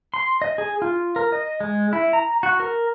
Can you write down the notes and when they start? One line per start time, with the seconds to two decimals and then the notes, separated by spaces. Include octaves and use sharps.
0.14 C6
0.42 D#5
0.58 G#4
0.82 F4
1.16 A#4
1.32 D#5
1.61 G#3
1.93 E4
2.13 A#5
2.43 F#4
2.60 A#4